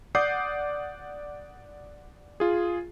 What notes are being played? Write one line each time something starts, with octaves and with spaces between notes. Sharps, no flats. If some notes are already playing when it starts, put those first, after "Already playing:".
D5 F#5 D6 D#6 G6 C7
F4 G#4